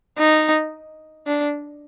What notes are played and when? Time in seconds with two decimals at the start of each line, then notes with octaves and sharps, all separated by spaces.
0.19 D#4
1.27 D4